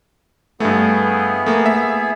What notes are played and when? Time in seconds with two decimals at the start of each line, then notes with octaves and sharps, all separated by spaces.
0.60 G2 A3 B3 E4 G#4
1.46 A3 A#3
1.66 E5